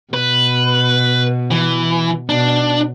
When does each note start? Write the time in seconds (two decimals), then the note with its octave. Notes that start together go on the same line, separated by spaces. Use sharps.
0.14 B2 B4
1.51 E3
2.29 B2 D4